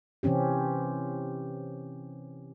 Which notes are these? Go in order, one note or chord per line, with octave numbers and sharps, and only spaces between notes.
C3 E3 C4 C#4 G4